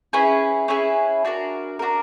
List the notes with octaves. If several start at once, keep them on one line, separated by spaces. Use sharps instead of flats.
C#4 E4 G#4 B4
C#4 E4 G#4 B4
D4 F#4 A#4
D4 F#4 A#4